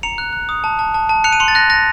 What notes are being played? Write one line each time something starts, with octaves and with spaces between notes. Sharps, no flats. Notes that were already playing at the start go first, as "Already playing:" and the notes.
A#5 C#7 F7
F#6
F#6
D#6
A5
A5
A5
A5
F#6 C#7 F7
D#7
C6 C#7 F7
A6
F#6 A#6
F#6 A#6